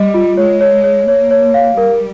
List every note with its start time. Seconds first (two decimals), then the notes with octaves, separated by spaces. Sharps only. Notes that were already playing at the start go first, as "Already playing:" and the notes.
Already playing: G3 D#5
0.14 F4
0.37 G#3 C#5
0.61 C#5
0.84 C#5
1.08 A#3 C#5
1.31 C#5
1.54 F5
1.78 G3 A#4